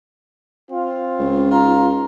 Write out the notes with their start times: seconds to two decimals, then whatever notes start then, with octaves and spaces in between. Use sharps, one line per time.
0.71 C4 F4
1.19 C#2
1.50 D#4 F4 A#5